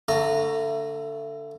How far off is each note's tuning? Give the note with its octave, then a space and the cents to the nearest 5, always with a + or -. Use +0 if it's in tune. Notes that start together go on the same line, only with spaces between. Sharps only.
D3 -25 A3 +20 A#5 -10